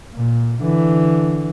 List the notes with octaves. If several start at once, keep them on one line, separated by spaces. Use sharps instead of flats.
A#2
D3 E3